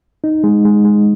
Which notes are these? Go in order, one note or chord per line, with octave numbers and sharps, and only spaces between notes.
D#4
G#3
G#3
G#3